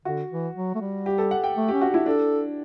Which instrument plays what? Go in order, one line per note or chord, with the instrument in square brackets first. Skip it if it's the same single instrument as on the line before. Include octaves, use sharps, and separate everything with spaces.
[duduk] D3 [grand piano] F#4
[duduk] E3
F#3
A3
G3
[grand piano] G4
A4
F#5
G5
[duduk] A3
[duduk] C#4 [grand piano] G4
[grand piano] F#4
[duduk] D4 [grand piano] E4
[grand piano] D4 [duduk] A4